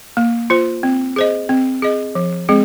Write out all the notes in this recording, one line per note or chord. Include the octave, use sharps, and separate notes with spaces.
A#3
F4 C5
C4
G#4 C5 D#5
C4
G#4 D#5
F3
G#3 C4 G#4